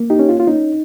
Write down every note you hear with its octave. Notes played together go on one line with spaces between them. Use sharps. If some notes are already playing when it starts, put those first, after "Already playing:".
Already playing: A#3
D#4 G4
C#4
F4
F4
C#4 D#4